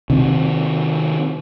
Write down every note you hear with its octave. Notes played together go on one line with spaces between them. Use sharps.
C3 D#3 C4